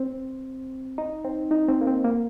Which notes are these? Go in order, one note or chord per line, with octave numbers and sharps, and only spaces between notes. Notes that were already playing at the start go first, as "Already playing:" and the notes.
Already playing: C4
D#4
C4
D#4
C4
A#3
C4
A#3